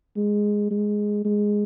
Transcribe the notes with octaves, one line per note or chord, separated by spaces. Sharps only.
G#3
G#3
G#3